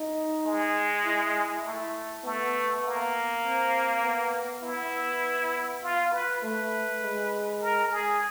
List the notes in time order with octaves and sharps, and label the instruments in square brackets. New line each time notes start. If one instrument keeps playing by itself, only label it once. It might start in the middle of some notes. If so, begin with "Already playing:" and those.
Already playing: [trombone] D#4
[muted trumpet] G#3
[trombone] E4
[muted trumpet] A3
[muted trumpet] A3 [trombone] B3
[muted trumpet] A#3
[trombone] C4
B3
[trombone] B3 [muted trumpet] E4
[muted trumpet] F4
B4
[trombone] A3 [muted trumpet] B4
[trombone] G#3
[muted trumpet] A#4
G#4